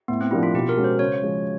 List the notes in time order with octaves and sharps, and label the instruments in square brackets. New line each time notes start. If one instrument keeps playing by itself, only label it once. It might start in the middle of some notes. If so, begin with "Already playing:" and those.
[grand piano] A2 [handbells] B3
[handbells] C4
[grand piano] F3 A#3 D4 G4 [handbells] E4
[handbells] F4
[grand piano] B2 [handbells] G4
[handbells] A#4
[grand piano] G#3 C#4 F#4
[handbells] C5
[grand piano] C#3 [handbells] C#5
[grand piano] F3 G#3